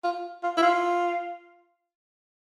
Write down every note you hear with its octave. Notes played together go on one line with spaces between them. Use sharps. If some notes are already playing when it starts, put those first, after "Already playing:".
F4
F4
E4
F4